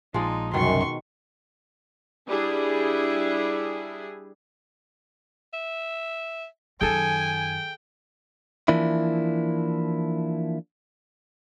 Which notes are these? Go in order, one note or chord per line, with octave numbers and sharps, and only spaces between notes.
A#1 F3 G#3 D#4 D5
F#1 C2 F#2 B2 D#3 C6 C#6
G3 D4 E4 G#4
E5
F#2 D#3 G#4 A4 G5 G#5
E3 F3 A#3 D4 E4